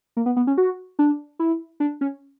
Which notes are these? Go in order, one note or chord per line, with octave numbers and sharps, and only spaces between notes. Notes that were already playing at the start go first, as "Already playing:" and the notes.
A#3
B3
B3
C#4
F#4
D4
E4
D4
C#4